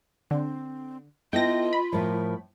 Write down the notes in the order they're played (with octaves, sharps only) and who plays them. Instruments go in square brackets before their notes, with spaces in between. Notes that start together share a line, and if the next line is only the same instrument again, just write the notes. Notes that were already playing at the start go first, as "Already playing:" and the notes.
[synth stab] D3 [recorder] C4
[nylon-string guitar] B3 E4 A4 [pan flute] F4 [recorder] D#5 [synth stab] G5 A#6
[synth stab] B5
[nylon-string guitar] A2 F3 [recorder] A#4